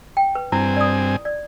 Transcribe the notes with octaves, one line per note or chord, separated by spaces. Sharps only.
G5
B4
G2 C4 E4 G#5
D5 D#6
D5